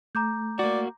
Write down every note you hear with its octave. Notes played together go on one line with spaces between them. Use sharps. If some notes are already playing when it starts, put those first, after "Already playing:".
A3 A#5 D6 G6
A#3 F#4 D5